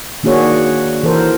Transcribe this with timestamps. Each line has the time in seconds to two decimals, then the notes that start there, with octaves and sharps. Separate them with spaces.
0.23 D#3 A#3 D4 F#4 G#4 C#5
1.03 E3 A4 A#4 C5